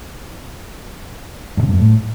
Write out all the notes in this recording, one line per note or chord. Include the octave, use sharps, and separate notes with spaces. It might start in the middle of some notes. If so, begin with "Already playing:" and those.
G2
C3
G2
F#2
A2